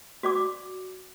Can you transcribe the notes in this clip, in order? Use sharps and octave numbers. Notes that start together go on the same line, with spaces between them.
F#4 D5 D6